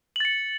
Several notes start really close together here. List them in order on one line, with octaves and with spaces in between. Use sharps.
F#7 A6 C#7